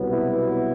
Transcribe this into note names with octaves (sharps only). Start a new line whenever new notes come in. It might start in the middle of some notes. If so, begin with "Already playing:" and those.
Already playing: C2 B2 F#3 B3
E4